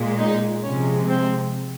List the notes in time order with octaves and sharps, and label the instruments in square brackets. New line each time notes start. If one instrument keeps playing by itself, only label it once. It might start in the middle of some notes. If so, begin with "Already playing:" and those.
Already playing: [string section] A#2 G#3
D#4
C3 F3 G#3 C#4
C4